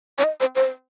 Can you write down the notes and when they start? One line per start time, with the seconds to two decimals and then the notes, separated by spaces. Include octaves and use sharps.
0.18 C#5
0.24 D#5
0.40 C5
0.56 C5